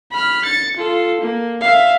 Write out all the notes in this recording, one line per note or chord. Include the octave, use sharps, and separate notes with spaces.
B5 F6
A6 C#7
F4 A4
A#3
E5 F5